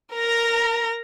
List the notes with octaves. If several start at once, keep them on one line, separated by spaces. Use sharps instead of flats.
A#4 A#5